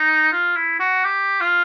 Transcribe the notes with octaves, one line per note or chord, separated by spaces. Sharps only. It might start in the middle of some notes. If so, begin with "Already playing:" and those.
Already playing: D#4
F4
E4
F#4
G4
F4